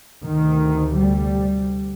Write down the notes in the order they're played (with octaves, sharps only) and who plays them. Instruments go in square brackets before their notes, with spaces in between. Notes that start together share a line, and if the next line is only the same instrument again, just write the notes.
[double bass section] D2 C3 D#3
G3